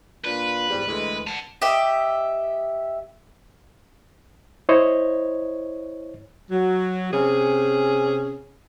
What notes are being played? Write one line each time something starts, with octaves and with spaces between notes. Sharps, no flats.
A#2 D4 F4 B4
E2 G#2 G3
D2 E3 G#3
F#5 A5
G4 D#5 E5
E4 C5 C#5 D#5
F#3
C3 C#4 G#4